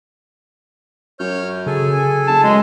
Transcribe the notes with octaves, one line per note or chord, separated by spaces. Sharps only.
F#2 C#5 F6 G6
C#3 G#4 A4 G#5
F#1 A5
F#2 G#3